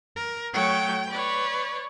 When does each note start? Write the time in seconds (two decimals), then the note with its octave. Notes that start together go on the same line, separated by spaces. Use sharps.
0.16 A#4
0.53 F#3 A3 C#5 G5
1.10 B4 C#5 D5